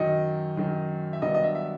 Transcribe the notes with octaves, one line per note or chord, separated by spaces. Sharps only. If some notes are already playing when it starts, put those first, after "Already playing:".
Already playing: F#2 D#3 F#3 D#5
F#2 D#3 F#3
E5
G2 D#3 F#3 B3 D4 D#5
D#5
E5
E5